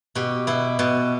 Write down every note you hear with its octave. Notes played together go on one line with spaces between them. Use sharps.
B2 G4
B2 E4
B2